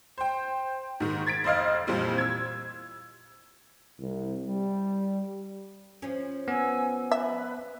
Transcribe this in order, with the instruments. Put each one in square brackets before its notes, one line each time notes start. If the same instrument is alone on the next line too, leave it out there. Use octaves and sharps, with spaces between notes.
[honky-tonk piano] C5 G5
G#2 D#3
G#6 A6 B6 D7
F1 C5 D#5 F5 F6
F2 A#2 E3 G3 C4
E6 G#6
[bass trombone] C2
G3
[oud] F3 C#4
[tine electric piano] B3 [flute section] G#5 E6
[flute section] B4 [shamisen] E5